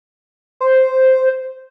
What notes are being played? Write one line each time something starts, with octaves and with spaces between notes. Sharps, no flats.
C5